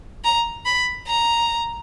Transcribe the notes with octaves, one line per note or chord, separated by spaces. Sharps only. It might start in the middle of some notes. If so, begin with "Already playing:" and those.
A#5
B5
A#5